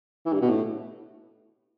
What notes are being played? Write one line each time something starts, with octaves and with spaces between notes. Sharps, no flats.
E3
G2
B2
A2